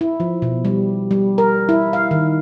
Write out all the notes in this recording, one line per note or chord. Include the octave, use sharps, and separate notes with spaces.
E4
F3
B2
G3
G3
A#4
E4
F5
D#3